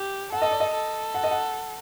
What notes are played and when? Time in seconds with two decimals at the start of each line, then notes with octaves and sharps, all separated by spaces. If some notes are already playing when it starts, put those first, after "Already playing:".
Already playing: G4
0.32 A4 F#5
0.42 D#5
0.51 D5
0.60 D#5
0.74 A4
1.14 F#5
1.24 D#5
1.31 F#5